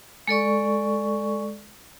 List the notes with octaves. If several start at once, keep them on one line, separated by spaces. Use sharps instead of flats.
G#3 A4 D5 C#6